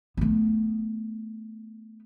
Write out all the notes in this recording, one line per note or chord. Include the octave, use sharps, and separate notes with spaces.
A3 B3